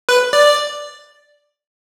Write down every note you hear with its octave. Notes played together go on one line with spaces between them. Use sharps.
B4
D5